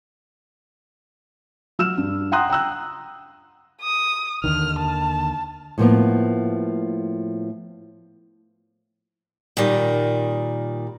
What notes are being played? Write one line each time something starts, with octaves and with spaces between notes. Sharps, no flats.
F#3 E6 F6 E7
G2
F#5 G5 A#5 C6 D#6 F#6
G5 A#5 E6 F#6
D#6
D#2 D3 D#3 F6
A5
A2 F3 A#3 B3
A#2 D#3 G3